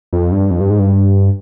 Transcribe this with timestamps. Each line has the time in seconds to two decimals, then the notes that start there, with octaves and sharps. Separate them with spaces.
0.13 F2
0.32 G2
0.51 F2
0.61 G2
0.70 G#2
0.80 G2